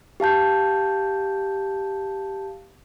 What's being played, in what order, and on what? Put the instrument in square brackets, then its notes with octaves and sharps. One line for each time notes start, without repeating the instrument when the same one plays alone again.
[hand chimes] G4 F5 A5 G6